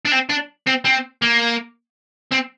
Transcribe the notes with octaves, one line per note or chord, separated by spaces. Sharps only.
D4
C4
D4
C4
C4
A#3
C4